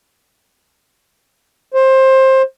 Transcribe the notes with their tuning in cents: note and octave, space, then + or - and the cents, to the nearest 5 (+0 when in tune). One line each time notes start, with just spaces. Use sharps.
C5 +20